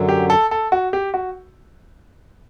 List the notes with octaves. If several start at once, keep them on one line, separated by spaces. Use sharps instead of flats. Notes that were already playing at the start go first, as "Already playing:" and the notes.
Already playing: F#2 D3 F#3
G4
A4
A4
F#4
G4
F#4